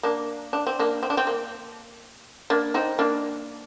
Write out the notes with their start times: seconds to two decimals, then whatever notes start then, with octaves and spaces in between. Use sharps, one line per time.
0.03 A#3 D4
0.53 D4
0.67 C4
0.79 A#3 D4
1.03 C4
1.10 D4
1.17 C4
1.27 A#3
2.50 A#3 D4
2.74 C4 D#4
2.99 A#3 D4